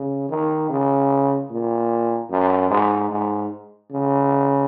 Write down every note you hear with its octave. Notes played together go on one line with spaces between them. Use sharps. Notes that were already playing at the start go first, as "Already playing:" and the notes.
Already playing: C#3
D#3
C#3
A#2
F#2
G#2
G#2
C#3